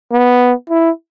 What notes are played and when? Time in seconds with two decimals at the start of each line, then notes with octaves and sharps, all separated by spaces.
0.12 B3
0.70 E4